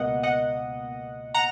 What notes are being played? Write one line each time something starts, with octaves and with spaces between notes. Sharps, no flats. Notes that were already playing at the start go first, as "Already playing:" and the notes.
Already playing: C#2 B2 A#3 D#5 F#5
D#5 F#5
F#5 A#5